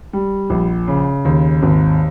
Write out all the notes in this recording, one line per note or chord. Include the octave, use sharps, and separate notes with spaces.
G3
A#1
C#3
D#2
G#1